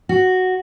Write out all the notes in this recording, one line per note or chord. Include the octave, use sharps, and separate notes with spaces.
F#4